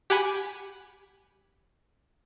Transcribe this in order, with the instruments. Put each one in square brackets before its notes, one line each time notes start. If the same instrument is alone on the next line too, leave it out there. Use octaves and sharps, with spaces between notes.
[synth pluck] G4 F#5 G#5 B5